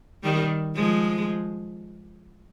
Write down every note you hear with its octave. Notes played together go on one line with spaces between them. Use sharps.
D#3 G3
F3 G#3